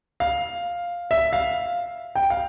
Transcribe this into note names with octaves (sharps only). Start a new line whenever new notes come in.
F5
E5
F5
G5
F5